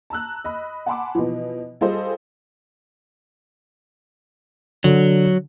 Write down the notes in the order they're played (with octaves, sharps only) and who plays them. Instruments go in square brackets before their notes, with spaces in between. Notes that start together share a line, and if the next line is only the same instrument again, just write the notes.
[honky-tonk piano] A5 A#5 E6 F#6
D#5 B5
F#5 G#5 A5 B5 C6 D6
B2 E3 F3
G3 F4 G#4 A4 C5 D#5
[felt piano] D3 [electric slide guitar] F#3